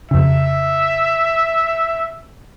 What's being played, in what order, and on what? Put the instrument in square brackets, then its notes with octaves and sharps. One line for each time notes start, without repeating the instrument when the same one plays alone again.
[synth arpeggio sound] F2 C#3 [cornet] E5